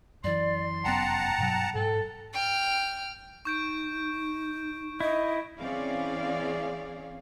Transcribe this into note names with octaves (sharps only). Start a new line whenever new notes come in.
F#2 E3 D5 C6
F1 F#2 B3 F#5 G5 A5 A#5
G2 B2 F#3
G#2 A4
G5 F6
D#4 C#6 G6 D7
E4 D#5
E3 C4 C#4 G#4 D5 F5